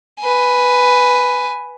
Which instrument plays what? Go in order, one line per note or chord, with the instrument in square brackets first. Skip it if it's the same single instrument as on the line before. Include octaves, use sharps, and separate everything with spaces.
[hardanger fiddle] B4 G#5